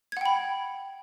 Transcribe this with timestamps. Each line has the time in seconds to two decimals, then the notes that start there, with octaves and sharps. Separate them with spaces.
0.12 G#6
0.17 F#5
0.21 G5
0.26 B5